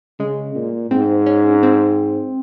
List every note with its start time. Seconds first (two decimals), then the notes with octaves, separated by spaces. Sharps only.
0.19 C#3 G#3
0.55 A#2
0.91 G#2 C4
1.26 C#4
1.63 C4